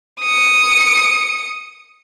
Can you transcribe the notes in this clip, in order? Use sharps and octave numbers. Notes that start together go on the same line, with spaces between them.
D#6 C#7